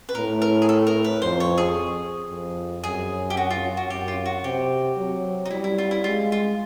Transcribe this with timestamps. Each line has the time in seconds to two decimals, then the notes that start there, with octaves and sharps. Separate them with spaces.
0.09 B4
0.15 A2 A#4
0.42 A#4
0.62 G#4
0.69 A4
0.87 A#4
1.04 B4
1.22 F2 C5
1.40 C#5
1.58 G#4
2.29 F2
2.83 F#2 G#4
3.30 G4
3.37 F#4
3.50 F4
3.77 F#4
3.90 F#2 G4
4.08 F4
4.26 F#4
4.44 C3 G4
4.97 F#3
5.46 D#4
5.51 G3 E4
5.64 E4
5.78 F4
5.91 E4
6.04 G#3 F4
6.32 F4